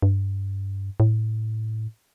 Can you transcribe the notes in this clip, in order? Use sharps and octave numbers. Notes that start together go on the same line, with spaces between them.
G2
A2